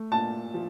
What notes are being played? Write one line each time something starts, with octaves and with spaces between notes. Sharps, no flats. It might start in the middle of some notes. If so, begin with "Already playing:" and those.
Already playing: A3
A#2 A5
F3